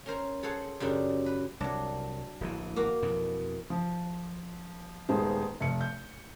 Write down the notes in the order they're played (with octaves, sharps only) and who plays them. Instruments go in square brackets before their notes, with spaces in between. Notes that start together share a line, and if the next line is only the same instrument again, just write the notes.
[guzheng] C#4 A#4 C5 A#5
G#4 A4 C5 C#5 F#5
F#2 C#3 G3 D4
B4
[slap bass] C2 [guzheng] F#3 D4
[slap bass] D1 A#1 E3
[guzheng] A#3 F#4 F5
[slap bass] F2 B2 E3
[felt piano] F3
D#1 D#3 G#3 B3 C5
F1 C#7
G6